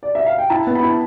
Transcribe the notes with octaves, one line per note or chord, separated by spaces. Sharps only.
D5
E5
F5
G5
E4 A5
B3
B5
E4